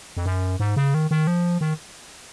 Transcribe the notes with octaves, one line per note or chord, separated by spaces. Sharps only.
F2
F#2
G#2
C#3
D#3
D#3
F3
D#3